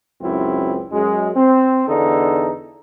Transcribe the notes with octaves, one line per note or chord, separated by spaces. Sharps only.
C#2 F#2 C4 E4
F#2 G#3
C4
E2 D3 D#4 A4